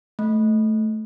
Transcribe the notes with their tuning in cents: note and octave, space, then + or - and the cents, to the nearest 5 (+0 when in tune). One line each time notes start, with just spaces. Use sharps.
A3 -10